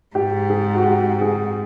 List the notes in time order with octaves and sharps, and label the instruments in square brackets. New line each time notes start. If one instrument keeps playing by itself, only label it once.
[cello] G#2 [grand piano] G4
[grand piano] G#4
F#4
G4
G#4